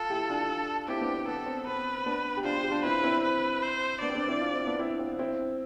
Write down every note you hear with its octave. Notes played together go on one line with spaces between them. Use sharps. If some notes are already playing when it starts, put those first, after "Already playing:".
Already playing: F4 A4
E4 G4
D4 F4
C4 E4 G4
B3 D4
C4
B3 A4
C4
C4 B4
B3 D4
G4
D4 F4 C5
G4
D4 F4
C4 E4 B4
C4 E4
B4
C5
B3 D4 D5
C4
B3 D4
C4 E4
D4 F4
C4 E4
B3 D4
C4 E4
C4
C4 E4